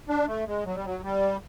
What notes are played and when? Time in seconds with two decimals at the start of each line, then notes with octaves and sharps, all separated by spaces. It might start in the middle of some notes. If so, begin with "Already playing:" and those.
0.09 D4
0.27 A3
0.47 G#3
0.66 F#3
0.75 G3
0.85 F#3
1.03 G3